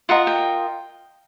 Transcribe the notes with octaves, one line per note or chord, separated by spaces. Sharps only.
F4 A#4 D#5 F#5
G5